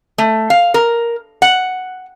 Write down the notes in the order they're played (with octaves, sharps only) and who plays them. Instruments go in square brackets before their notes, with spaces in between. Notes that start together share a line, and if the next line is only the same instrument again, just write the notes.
[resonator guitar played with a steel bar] A3
F5
A#4
F#5